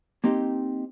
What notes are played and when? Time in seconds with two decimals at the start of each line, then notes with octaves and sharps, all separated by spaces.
0.24 A#3 C4 D#4 G4